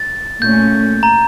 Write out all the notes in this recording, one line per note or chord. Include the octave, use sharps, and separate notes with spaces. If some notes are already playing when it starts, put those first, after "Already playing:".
Already playing: A6
A#2 A3 C#4 G6
A#5